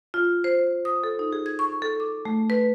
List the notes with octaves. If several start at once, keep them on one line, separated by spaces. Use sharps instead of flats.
F4
C5
D#6
A4
D#4
G#4
G#6
C#6
A4
D6
A3
B4